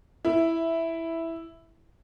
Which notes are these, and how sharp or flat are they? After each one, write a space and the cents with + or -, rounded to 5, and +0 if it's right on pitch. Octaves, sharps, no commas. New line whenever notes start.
E4 +0